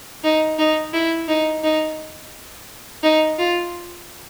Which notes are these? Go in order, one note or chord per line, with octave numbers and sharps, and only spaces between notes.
D#4
D#4
E4
D#4
D#4
D#4
F4